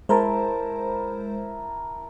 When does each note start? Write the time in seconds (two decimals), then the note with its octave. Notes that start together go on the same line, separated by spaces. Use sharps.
0.09 G#3 E4 A#4 C5 A5